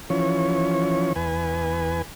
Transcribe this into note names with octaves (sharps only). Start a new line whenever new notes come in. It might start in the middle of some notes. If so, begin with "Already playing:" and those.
E3 F3 C#4 C#5
E2 B4 G#5